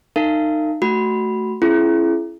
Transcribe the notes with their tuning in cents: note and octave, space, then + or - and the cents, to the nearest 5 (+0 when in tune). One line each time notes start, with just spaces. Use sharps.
D#4 -20 A#4 -45 F5 -30
A3 +0 F#4 +10 B5 -5
C#4 -25 E4 +30 G#4 +35